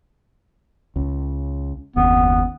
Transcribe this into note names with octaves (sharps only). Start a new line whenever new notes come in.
C#2
F#1 D#2 B3